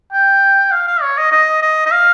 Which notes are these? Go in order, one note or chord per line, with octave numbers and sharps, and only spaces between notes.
G5
F5
F5
C#5
D#5
D#5
D#5
D#5
F5